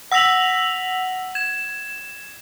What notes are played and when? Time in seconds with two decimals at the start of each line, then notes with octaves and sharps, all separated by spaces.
0.11 F#5 E6 A#6 B6 F7 F#7
1.35 G#6 E7